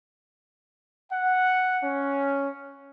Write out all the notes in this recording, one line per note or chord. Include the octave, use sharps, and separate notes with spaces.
F#5
C#4